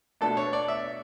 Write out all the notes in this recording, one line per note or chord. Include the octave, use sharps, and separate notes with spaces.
B2 A3 D4 A4
C#5
D5
E5